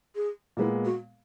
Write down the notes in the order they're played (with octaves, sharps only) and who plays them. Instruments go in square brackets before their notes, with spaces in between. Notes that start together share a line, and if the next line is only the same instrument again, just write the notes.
[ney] G#4
[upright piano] A#2 G#3 B3 [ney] E4
[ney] F#4